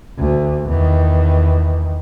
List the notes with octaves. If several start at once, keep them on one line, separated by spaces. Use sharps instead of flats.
D2
E2 D#3